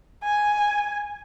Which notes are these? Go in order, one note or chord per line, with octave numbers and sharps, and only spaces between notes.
G#5